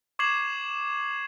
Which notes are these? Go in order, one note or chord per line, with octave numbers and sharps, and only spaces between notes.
C#6 D6 G#6 C7 E7 F#7